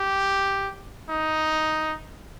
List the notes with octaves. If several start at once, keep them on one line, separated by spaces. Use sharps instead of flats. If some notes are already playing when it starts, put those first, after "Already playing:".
Already playing: G4
D#4